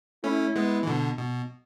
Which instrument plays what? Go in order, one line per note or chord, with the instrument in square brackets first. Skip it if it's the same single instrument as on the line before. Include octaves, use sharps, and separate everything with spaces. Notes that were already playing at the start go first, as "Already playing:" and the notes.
[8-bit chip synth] A3 C#4 [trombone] E4
[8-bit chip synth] G#3 B3
E3
B2 D3
B2